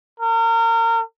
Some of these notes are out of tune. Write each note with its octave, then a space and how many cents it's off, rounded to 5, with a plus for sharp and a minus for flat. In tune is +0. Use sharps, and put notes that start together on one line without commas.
A#4 -30